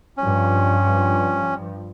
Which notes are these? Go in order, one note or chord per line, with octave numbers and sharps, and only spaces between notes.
G2 F3 C#4